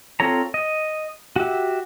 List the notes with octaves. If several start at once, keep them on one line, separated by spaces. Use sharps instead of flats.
C4 F4 A4 C#5 A#5
D#5
F#4 G4 E5